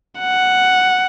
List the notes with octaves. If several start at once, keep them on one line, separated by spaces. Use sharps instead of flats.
F#5